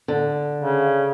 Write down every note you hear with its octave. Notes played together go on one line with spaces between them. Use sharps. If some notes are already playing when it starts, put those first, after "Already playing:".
D3
C#3